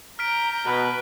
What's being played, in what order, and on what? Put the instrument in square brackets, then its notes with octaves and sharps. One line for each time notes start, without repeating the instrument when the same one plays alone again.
[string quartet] A#5 G6 [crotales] F6 B6 D7
[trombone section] B2 [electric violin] B4